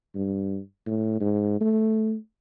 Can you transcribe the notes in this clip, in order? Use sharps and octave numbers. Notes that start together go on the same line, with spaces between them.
G2
A2
G#2
A3